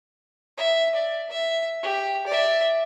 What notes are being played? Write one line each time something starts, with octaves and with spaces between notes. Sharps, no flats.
E5
D5
E5
G4
D5 E5